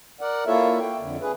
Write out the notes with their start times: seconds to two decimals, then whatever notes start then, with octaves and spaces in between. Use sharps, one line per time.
0.21 A#4 D5 F#5
0.47 A#3 E4 F4 A4 C#5 E5
0.80 G5
1.00 F2 D3
1.21 G#4 B4